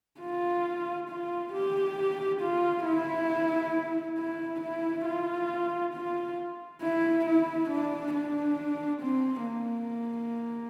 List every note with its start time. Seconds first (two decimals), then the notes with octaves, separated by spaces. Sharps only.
0.21 F4
1.10 F4
1.53 G4
2.42 F4
2.86 E4
4.18 E4
4.61 E4
5.06 F4
5.94 F4
6.82 E4
7.26 E4
7.70 D4
8.15 D4
9.02 C4
9.46 A#3